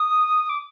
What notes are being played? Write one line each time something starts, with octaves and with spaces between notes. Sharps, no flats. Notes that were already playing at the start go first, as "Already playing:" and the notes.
Already playing: D#6
D6